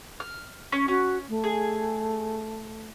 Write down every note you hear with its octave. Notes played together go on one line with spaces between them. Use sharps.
F6
C#4
C#4 F#4
A3
G#4